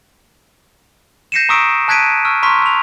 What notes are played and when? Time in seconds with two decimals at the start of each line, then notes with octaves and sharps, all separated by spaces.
1.32 G6 A#6 C7 C#7 D#7 E7
1.49 A#5 C#6 D#6 E6 B6 D7
1.88 A5 F#6 G#6 B6 D7 D#7
2.25 C#6 E6 F6
2.43 A#5 C6 C#6 F6 B6
2.62 E6 F7